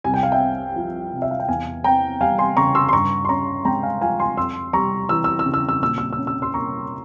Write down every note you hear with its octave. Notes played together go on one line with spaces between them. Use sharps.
C2 G#5
G5
F5
E5 G5
C4
F3
C3
E5
F5
G5
E2 F5 G#5
C4 G5 A#5
G3 F5 G#5
G#5 C6
C#3 A#5 C#6
C6 E6
C6
G2 A#5 C#6
C6
C#4 A#5 C#6
G#3 G5 A#5
F5 G#5
F3 F5 G#5
G#5 C6
F2 C6 E6
G3 A#5 C#6
E3 E6
E6
E6
C#3
E6
E6
A#2 E6
E6
E6
C#4
E6
C6 E6
A#3 A#5 C#6